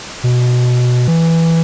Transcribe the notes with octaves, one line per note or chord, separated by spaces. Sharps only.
B2
E3